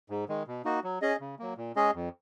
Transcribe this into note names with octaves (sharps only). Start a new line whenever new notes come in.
G#2
D#3 G#3
B2
A#3 D#4 F#4
F#3
C#4 G#4 D#5
C#3
F#3 A#3
A#2
G#3 C#4 G#4 D#5
F2